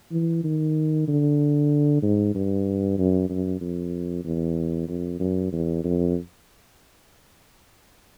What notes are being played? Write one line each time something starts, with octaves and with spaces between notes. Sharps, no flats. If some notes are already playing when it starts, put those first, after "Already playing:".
E3
D#3
D3
G#2
G2
F#2
F#2
F2
E2
F2
F#2
E2
F2